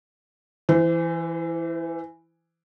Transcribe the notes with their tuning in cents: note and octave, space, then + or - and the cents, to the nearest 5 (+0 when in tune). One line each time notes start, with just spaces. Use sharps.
E3 +5 C5 -40